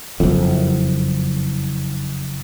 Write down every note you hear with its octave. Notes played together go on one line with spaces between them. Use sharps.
F#1 F2